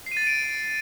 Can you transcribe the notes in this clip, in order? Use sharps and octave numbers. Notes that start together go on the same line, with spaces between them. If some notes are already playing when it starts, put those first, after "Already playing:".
C7
D#7
A6
D#7
D7